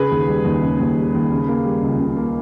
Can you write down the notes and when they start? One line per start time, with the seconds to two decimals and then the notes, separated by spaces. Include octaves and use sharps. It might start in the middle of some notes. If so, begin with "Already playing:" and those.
Already playing: C#3 G#4 B4
0.11 D#2
0.28 G3
0.45 D#2
0.62 C#3
0.80 D#2
0.97 G3
1.14 D#2
1.31 C#3
1.48 A#3
1.65 G3
1.82 C#2
2.00 C#3
2.17 A#3